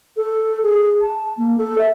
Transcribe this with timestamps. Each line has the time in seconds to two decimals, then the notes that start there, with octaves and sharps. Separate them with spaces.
0.17 A4
0.63 G#4
1.01 A5
1.37 A#3
1.58 A4
1.78 E5